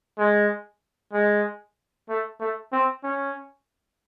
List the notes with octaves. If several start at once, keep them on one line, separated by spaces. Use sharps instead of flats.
G#3
G#3
A3
A3
C4
C#4